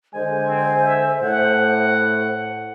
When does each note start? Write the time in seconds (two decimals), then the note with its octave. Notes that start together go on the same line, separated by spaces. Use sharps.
0.15 D3 G#3 C5 G#5
0.46 C4
0.82 E5
1.22 A2 F#5